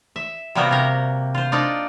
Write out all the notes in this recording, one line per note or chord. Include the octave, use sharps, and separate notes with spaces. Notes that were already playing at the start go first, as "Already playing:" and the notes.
E5
C3 G3 A#3 B3 F#4 A#4
C3 A#4
F4 C5
D4 D#4 F4 D5